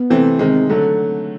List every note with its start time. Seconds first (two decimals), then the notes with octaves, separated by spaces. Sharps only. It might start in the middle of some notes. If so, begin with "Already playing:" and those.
Already playing: B3
0.10 C3 E3 A3 C4
0.39 C3 D#3 G#3 C4
0.70 D3 F#3 A3